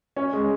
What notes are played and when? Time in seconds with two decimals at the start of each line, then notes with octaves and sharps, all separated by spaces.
0.16 C#4
0.33 G#3